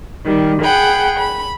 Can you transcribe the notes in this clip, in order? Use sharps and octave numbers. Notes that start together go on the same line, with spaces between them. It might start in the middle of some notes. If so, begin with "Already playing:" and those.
D#3 G3
G#4 F#5 G5 B5
B5